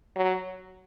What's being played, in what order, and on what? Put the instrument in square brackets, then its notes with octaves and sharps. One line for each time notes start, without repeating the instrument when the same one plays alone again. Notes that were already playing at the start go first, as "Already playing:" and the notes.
[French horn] F#3